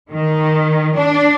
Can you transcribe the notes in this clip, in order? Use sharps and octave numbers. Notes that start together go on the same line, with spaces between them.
D#3
D4